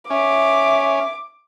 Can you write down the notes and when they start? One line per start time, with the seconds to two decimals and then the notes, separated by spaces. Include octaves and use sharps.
0.10 C#4 E5 D6